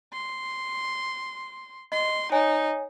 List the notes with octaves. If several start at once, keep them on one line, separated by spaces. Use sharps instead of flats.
C6
D#5 C6
D#4 C#5 G#5